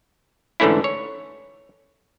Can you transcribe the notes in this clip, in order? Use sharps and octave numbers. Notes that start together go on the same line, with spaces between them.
G#2 D3 E3 A3 C#4 E4
C#5